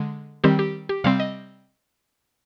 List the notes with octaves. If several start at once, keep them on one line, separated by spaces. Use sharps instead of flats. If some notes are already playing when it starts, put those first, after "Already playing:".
Already playing: D3 G#3
D#3 G3 C4 G4
G4
G4
C3 G3 C4 F5
D#5